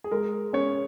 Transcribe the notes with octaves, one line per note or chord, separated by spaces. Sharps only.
G#4
G#3 A#4
C#4 C#5